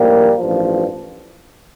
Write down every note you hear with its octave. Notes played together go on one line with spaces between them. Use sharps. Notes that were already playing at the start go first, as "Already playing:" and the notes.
Already playing: A#1 A2 F3 G3 A#3
A1 G2 F3